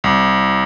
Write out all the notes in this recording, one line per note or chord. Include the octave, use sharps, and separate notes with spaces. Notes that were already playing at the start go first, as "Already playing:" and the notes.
C2